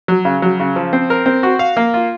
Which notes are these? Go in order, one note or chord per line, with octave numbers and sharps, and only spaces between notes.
F#3
C#3
F#3
C#3
F3
C4
A#4
C4
F#4
F5
A#3
F4